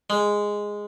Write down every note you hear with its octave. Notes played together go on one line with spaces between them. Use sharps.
G#3